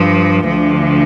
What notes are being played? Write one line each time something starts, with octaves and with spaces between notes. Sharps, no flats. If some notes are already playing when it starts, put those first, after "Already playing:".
Already playing: G2 F3
D2 D3 F3